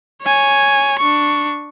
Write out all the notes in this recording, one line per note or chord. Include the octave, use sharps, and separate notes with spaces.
C#5 G#5
D4 C#6